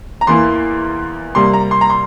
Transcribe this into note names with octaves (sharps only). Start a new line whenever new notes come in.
A#5
E2 E3 A#3 E4 C6
C3 G3 A#3 C6
A#5
C6
A#5
C6